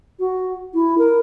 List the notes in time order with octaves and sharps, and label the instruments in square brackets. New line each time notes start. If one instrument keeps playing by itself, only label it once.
[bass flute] F#4
E4
A#4